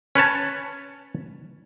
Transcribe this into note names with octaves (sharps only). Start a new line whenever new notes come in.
C#4 B4 C#5 A5